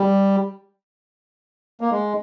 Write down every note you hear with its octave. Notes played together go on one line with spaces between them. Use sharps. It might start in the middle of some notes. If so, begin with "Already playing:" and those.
Already playing: G3
A#3
G#3